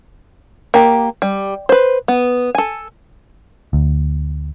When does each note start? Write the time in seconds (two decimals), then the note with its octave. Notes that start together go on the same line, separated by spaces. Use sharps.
0.74 A#3 G4
1.22 G3
1.69 B4 C5
2.08 B3
2.55 A4 G#5
3.73 D2